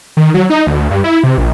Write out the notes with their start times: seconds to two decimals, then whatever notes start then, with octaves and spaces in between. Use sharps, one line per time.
0.17 D#3
0.34 F#3
0.50 D#4
0.67 D2
0.91 G2
1.04 E4
1.23 C3
1.38 A#1